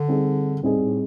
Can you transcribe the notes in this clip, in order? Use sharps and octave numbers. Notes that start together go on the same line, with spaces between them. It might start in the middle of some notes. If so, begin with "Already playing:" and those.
Already playing: D3
G3 C4 D#4 G#4
A2 G3 C4 D#4 G#4
G#2
A2